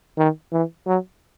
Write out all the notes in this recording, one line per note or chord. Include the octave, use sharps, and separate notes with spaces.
D#3
E3
F#3